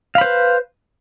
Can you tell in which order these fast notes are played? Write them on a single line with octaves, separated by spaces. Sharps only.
F5 B5 C5 B4